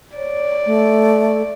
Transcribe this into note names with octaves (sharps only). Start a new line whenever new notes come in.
C#5 D5
A3